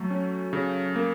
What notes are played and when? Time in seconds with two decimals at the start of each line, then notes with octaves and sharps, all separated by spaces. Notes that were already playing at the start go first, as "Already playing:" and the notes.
Already playing: F#3 A3
0.10 C#4
0.53 C#3
0.96 A#3